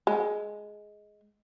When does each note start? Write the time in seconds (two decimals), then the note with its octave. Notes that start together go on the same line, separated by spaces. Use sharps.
0.07 G#3